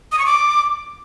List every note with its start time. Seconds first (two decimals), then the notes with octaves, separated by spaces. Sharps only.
0.12 D#6
0.19 C#6
0.26 D6